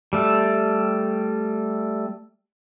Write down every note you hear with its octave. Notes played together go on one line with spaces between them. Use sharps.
G3 A3